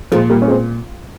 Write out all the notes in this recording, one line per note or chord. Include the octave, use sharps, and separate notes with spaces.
A#2 F3 G#3
G3 A#3
C#4
G#3 C4